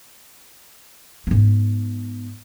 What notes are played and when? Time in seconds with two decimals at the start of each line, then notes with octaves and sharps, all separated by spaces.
1.27 G#2 B3